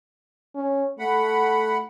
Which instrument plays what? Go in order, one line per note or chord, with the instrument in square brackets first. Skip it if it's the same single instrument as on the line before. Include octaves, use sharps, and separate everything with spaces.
[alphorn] C#4
[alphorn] A3 [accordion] F#5 B5